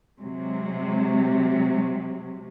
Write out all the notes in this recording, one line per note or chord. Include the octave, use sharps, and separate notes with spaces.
C3 F#3 G#3